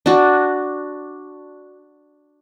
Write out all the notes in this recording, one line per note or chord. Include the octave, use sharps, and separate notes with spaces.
D4 F#4